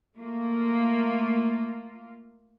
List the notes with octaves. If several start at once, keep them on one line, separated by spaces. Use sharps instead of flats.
A3 A#3 F4